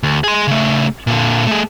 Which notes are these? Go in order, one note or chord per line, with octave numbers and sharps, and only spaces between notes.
D2
G#4 C6
C#3 A3
A#2 D3
A3 G#4